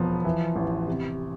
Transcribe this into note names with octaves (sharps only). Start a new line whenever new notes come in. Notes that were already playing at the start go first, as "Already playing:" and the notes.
Already playing: E1 F3 B3
E3
A1
C3